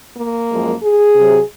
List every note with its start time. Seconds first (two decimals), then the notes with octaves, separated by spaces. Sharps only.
0.17 A#3
0.49 F#2 F3 G#3
0.82 G#4
1.15 C3
1.20 F#3